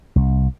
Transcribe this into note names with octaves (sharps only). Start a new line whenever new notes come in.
C2